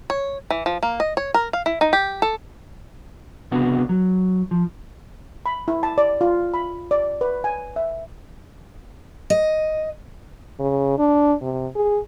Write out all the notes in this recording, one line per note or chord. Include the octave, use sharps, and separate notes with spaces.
C#5
E3
F3
A#3
D#5
C#5
A#4
F5
E4
D#4
G4
A4
C#2 C3 B3 D4 F#4
F#3
F3
B5
E4
A5
D5
F4
B5
D5
B4
G#5
E5
D#5
C#3
D4
C3
G#4